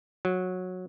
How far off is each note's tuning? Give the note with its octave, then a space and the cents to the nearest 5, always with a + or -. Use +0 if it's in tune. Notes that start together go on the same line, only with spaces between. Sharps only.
F#3 -15